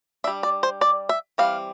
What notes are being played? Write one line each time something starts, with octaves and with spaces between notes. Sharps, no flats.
G3 D4 E5
D5
C5
D5
E5
E3 G3 C4 F5